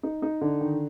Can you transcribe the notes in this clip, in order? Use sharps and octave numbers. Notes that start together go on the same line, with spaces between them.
D#4
D#4
D3
D#3